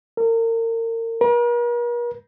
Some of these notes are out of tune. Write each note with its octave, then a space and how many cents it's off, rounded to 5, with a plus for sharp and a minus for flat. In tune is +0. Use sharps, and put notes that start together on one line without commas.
A#4 -35
A#4 +45